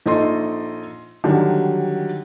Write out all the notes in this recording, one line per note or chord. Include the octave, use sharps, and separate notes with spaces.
A#1 D#4 A4 D#5 C6
D3 D#3 F#3 G3